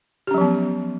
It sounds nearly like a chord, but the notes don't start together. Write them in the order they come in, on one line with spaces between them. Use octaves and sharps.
G4 C#4 F#3 F3 B3